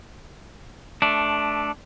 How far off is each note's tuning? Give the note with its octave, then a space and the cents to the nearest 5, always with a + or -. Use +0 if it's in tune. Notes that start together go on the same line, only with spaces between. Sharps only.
A3 -15 D4 +0